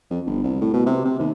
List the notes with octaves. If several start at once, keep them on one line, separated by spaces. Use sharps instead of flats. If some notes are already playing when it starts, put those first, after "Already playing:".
F2
G1
C2
A2
B2
C3
C3
D#2